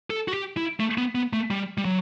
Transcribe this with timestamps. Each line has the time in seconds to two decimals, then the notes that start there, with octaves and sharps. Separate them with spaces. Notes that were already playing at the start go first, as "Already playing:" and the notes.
0.10 A4
0.28 F#4
0.34 G4
0.57 E4
0.80 A3
0.98 B3
1.15 B3
1.33 A3
1.51 G3
1.78 G3
1.85 F#3